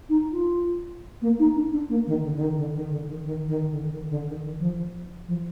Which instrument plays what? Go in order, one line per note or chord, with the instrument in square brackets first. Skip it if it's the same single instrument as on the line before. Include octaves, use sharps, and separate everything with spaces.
[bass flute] D#4
F4
A#3
D#4
D4
D4
A#3
D#3
D3
D3
D#3
D3
D#3
D3
D#3
D#3
D#3
D3
D#3
D3
D#3
D#3
F3
F3